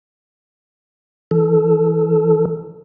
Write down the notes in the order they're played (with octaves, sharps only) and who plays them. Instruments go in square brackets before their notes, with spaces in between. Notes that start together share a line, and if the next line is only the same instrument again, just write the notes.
[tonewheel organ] E3 A4